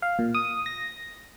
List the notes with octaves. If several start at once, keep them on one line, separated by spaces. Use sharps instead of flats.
F5
A#2
D#6
A#6